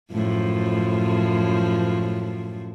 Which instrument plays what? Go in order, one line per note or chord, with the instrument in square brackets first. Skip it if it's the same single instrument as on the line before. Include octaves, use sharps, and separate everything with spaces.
[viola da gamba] F#2 A2 F3